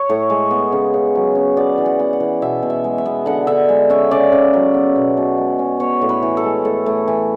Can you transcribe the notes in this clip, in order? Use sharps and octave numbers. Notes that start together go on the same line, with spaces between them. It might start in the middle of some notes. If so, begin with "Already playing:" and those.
Already playing: C#5
A2
G#3
B3
C#3
C#3
F#3
C#4
B3 D5
E3
F#5
B3
F#5
E3
B2 E5
B2
E5
G#3
E5
B3
D3 F#5
D3 E5
G#3
C#4 E5
C#3 D5
C#3
F#3
B3
B2
B2
G#3
C#4
B3 C#5
A2
B4
E3
A4
G#3
A2
A2
E3